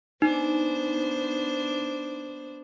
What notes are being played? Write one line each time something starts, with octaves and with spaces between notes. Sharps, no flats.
B3 D4 D#4 C5